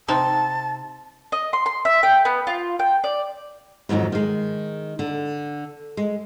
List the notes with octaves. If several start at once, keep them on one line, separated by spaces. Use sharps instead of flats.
C3 C4 D#4 A5
D#5
C6
C6
E5
G5
B3
F4
G5
D5
F2 G#2 D#3 F#3 D#4
D#3 G#3
D3
G#3